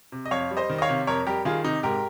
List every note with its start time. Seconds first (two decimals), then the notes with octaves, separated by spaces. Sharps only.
0.12 C3
0.26 D#5
0.31 F2 C#5 F5
0.51 G3
0.57 C5 D#5
0.70 D#3
0.78 D#5
0.82 C#5 F5
0.89 C3
1.07 F2 A#4 C#5
1.26 G3 G4 A#4
1.45 D#3 F4 G#4
1.64 C3 D#4
1.83 G#2 G4 A#4